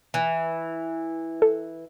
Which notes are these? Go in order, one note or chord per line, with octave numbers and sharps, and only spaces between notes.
E3
A4